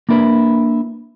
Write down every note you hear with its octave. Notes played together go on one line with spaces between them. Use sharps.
A#3 D4 E4 A#4 B4